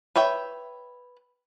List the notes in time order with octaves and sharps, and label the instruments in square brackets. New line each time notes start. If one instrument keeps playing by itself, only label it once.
[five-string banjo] B4 C#5 E5 G5